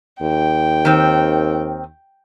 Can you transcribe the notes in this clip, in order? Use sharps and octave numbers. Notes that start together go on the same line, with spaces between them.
D#2 G5
D#3 C4